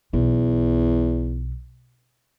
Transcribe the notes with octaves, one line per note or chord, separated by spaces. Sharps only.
B1 E2